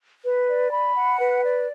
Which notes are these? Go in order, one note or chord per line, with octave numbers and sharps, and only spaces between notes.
B4
D5
B5
F#5
B4
D5